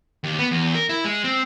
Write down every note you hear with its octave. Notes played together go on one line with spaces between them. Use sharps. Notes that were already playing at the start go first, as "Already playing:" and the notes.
D#2
B3
E2
A#4
E4
G#3
C4